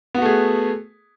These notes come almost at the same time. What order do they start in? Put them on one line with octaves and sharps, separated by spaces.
B3 F#4 A3 G#4